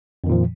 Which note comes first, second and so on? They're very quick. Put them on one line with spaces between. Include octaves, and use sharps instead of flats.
F2 D#3 A#2 F3